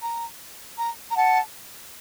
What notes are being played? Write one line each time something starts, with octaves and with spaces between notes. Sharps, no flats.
A#5
A#5
A#5
F#5 A5